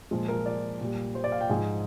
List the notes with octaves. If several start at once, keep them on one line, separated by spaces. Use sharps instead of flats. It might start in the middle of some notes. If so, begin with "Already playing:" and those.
A#2 F3 G#3
A#4
D5
A#2 G3
C5
D5
F5
G5
G#2 F3 G#3 G#5